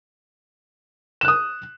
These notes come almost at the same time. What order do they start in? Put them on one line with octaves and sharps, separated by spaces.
E7 F#6 D#6